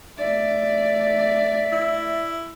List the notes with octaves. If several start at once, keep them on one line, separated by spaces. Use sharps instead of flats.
A3 D5 E5
E4